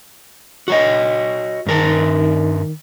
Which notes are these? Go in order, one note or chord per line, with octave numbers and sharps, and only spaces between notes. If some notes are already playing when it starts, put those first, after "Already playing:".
F#4 C#5 D#5
G2 D#3 A#4 A5